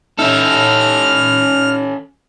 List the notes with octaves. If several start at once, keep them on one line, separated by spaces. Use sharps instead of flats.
C#4 D#4 A4 E5 F6